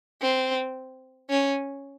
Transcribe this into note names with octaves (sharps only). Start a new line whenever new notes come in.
C4
C#4